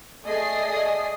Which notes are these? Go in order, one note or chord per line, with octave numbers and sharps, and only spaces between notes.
A3 G#4 D5 D#5 D#6 C7